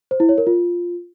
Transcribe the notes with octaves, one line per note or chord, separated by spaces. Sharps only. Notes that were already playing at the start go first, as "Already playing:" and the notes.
C5
E4
C#5
A#4
F4